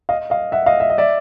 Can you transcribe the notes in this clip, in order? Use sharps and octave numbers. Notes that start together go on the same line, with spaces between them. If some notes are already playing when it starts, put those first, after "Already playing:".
D#5 F5
D#5 F5
E5 F#5
D#5 F5
E5
D#5
D5 E5